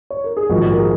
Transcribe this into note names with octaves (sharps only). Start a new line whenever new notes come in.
C#5
A#4
G#4
A#1 G#2 D#3 F#4
A#4
G#4